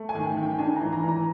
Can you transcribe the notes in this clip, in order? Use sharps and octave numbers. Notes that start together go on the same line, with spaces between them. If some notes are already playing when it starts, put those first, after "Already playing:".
Already playing: A3
G#5
D#3
G5
D#3
G5
D4 G#5
E3 A#5
A#5
E3
A#5